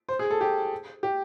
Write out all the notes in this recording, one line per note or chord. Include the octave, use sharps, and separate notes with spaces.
C5
G#4
A4
G4
G4